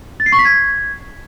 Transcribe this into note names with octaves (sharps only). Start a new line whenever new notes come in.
A6
C7
C#6
B6
G#6